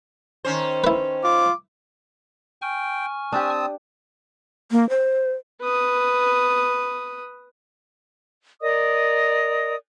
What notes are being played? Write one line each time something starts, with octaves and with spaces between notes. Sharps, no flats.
D#3 C#4 C5
E4 B4
F4 D6
G5 G#5 C#6 F6
C4 D4 G4 A5 D#6
A#3
C5
B4 D#6
A#4 D5 D#5 D#6